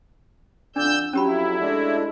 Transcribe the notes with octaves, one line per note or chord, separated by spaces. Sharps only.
F2 D3 D4 D5 E6 G6
F2 F#3 C#4 E4 G4 B5
G#3 A3 D4